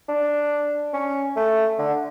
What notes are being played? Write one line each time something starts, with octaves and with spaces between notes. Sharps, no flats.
D4
C#4
A3
D3